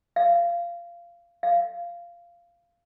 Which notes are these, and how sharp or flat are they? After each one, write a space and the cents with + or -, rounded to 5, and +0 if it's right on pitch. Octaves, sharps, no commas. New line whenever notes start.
F5 -20
F5 -15